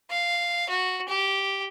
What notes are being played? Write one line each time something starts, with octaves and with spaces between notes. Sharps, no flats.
F5
F#4
G4